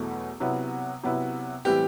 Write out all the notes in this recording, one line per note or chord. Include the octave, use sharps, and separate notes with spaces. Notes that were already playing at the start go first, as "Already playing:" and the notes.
Already playing: E2 B2 F#3 A3 E4
C3 F#3 B3 E4
C3 F#3 B3 E4
A2 E3 G3 C4 E4 G4